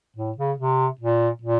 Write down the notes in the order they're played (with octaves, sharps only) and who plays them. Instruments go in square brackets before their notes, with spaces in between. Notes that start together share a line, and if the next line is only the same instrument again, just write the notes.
[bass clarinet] A2
C#3
C3
A#2
A#2